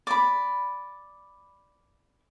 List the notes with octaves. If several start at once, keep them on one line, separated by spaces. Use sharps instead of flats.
D5 B5